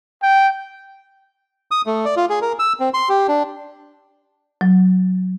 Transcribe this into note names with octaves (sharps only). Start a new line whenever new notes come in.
G5
D#6
A3
D5
F4
G#4
A#4
E6
C4
C6
G4
D4
F#3